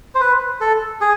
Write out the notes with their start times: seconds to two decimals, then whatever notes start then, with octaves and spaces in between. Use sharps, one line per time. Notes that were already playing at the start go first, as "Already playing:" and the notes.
0.15 C5
0.21 B4
0.61 A4
1.01 G#4